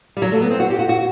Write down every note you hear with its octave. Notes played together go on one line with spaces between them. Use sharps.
G3
F#3
A3
B3
C4
F#4
G4
F#4
F#4